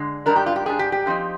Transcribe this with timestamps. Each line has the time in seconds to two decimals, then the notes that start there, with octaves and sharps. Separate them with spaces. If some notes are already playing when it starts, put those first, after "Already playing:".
Already playing: D3 G#3
0.26 G#2 G3 D4 A#4
0.36 G4
0.46 F4
0.56 G4
0.66 G#2 G3 D4 G#4
0.79 G4
0.92 G4
1.06 D3 F3 C4 D#4